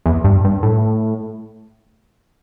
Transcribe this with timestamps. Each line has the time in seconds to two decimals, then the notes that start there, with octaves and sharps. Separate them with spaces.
0.06 E2
0.24 G2
0.44 G2
0.63 A2